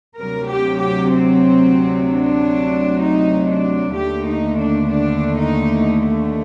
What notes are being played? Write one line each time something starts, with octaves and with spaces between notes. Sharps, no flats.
D2 C3 F#3 A#4
G4
G4
C4
D4
D#4
D4
D#2 D3 A3 G4
D#4
D4
D4
D#4